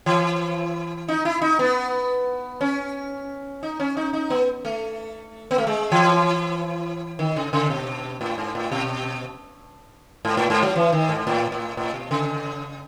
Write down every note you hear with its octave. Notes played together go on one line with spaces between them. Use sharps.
E3
D#4
E4
D#4
B3
C#4
D#4
C#4
D#4
D#4
B3
A3
B3
A3
G#3
E3
D#3
C#3
C#3
B2
A2
G#2
A2
B2
G#2
A2
G#2
F#3
E3
D#3
G#2
A2
A2
A2
B2
C#3